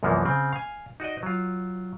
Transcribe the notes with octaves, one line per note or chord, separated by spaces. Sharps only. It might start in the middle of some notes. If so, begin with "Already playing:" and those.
C2 F#2 E3 F3 A#3 B3
C#3 C4
F5 G#5
D#4 F#4 D5 D#5
F#3 F4